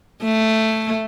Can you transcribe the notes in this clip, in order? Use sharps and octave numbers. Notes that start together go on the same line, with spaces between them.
A3